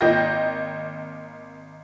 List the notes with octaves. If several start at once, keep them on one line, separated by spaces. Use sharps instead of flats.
G#1 A#3 D#5 G5 G6 A#6